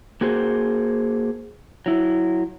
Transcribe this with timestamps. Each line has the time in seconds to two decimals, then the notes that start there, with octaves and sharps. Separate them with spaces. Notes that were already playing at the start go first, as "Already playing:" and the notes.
0.21 A#3 F#4 G#4 C5
1.86 F#3 E4